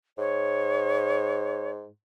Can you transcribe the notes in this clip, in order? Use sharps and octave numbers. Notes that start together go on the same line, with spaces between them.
G#2 C#5